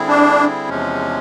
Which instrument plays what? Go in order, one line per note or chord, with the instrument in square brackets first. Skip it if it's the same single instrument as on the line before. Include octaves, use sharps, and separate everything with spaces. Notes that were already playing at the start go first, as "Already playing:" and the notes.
Already playing: [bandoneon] D3 G3 C4 E4 G#4
[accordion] D4
[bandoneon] E2 C3 F3 G#3 C#4